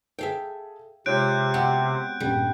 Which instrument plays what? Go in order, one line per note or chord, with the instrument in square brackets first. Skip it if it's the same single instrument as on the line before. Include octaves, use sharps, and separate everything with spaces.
[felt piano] G#4 A4 [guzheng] E5 F5 G5
[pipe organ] C3 [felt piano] G#3 F4 C#5 [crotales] F#6 G6 D7
[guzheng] B3 C4 F#4
[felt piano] D#1 G2 [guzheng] G3